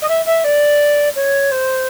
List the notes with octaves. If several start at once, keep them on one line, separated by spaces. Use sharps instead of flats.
D#5
E5
E5
D5
C#5
C5